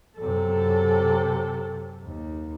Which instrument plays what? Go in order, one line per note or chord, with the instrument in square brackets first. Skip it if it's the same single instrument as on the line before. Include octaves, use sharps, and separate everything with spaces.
[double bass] F#2 C3 [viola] A4
[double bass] D#2